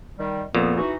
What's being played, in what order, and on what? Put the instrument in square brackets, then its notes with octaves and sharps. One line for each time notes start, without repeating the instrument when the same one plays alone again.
[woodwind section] D#3 G3
[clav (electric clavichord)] F2 A#2 [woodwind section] B3
[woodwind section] E3 D#4 F#4